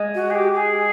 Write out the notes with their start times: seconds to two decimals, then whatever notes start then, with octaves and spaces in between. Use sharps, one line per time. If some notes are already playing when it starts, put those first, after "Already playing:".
Already playing: G#3
0.15 F#4
0.30 G#4
0.35 G4
0.55 G#4